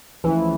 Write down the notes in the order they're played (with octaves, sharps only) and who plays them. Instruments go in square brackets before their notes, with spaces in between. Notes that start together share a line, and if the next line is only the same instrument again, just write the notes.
[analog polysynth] C#2 C#3 F3 A3 [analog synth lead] E3